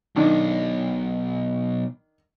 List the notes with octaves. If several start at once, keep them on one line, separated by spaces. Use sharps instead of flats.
B1 D#3 D4